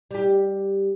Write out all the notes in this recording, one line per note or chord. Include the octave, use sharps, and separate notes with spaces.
G3 G4